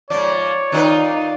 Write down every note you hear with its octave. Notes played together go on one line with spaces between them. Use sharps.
G#2 F3 C#5 D5
D#3 D#4 F4 B4